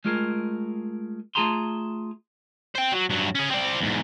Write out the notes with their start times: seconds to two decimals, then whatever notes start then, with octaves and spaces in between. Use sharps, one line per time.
0.05 G#3 A3 F4 G#4 A#4
1.35 A3 F4 G#4 A5 A#5 C6
2.75 C5 G5
2.92 F#3
3.10 G2 F#3
3.35 C#4 G#4
3.50 C4 D5
3.81 E2 G#2